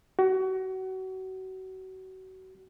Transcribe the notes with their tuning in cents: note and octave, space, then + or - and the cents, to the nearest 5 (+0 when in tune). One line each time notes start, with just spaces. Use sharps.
F#4 +30